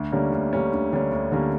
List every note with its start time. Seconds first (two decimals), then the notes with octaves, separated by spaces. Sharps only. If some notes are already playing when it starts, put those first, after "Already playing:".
Already playing: D2
0.12 D3 G3 A#3 C#4
0.32 D2
0.53 D3 G3 A#3 C#4
0.72 D2
0.93 D3 G3 A#3 C#4
1.12 D2
1.32 D3 G3 A#3 C#4